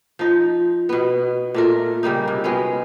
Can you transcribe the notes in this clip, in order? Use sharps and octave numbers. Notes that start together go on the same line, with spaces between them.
F3 D#4
B2 B3
A#2 A3 A#4
C#3 G3 A#3 D#4
C3
F#3 G#3 B3 C#4